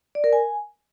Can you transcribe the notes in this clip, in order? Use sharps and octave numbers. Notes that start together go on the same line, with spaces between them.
D5
A#4
G#5